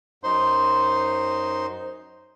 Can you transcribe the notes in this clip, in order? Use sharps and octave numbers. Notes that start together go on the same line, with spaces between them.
F#2 D#4 C5 C6